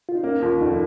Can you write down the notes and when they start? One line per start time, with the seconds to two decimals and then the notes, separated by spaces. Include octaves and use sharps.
0.09 F4
0.15 D#4
0.23 A#3 C#4
0.42 D#2 F4
0.61 F1 D#4